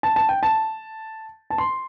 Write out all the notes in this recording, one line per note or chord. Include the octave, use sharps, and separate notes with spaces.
A5
A5
G5
A5
A5
C6